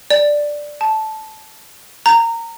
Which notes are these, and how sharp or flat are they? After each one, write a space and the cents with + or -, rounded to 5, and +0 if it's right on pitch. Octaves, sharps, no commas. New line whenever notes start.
D5 +5
A5 -10
A#5 -20